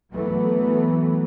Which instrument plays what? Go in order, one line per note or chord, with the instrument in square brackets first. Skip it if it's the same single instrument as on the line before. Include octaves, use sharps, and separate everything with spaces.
[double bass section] E3 F#3 A3 B3